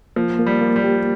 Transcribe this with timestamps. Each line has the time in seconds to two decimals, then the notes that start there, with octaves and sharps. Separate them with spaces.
0.16 F3 A#3
0.39 A#3
0.46 G3
0.61 A#3
0.76 G3
0.84 G4